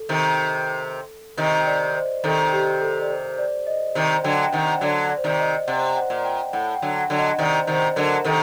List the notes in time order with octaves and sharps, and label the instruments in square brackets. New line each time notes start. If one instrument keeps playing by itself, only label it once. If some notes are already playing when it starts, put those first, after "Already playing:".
Already playing: [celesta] A4
[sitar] C3 D#3
[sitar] C3 D#3 [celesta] D#5
[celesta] D5
C5
[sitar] C3 D#3 [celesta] A4
[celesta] G4
A4
D5
C5
D5
D#5
[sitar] C3 D#3
[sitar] D3 F#3 [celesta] G5
[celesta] G5
[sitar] C3 D#3 [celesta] F#5
[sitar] D3 F#3 [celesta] D5
[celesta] D5
C5
[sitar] C3 D#3 [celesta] D5
[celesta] D#5
[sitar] C3 [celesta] F#5
[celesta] F#5
[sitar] A#2
[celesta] G5
[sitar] A2 [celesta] F#5
[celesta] G5
[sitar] D3 F#3
[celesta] F#5
[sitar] D3 F#3
[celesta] D#5
[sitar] C3 D#3 [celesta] D5
[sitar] C3 D#3 [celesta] C5
[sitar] D3 F#3 [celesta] A#4
[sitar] C3 D#3 [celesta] A4